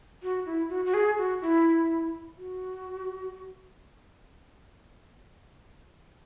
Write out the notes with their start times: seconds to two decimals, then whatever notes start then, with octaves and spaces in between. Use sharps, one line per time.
0.23 F#4
0.46 E4
0.70 F#4
0.85 F#4
0.94 G#4
1.17 F#4
1.42 E4
2.38 F#4